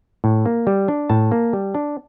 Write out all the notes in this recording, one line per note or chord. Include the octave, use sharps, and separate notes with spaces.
A2
A#3
G3
D4
A2 A5
A#3
G3
D4